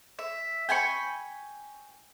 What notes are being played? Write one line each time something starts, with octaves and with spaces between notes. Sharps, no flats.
E5
G5 G#5 B5 C#6